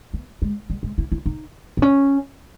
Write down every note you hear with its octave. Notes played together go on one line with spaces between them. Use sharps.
B3
G#3
G3
G#3
E4
E4
D#4
B3
C#4